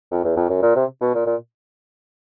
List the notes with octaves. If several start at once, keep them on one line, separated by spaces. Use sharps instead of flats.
F2
E2
F2
F#2
A#2
C3
B2
A#2
A#2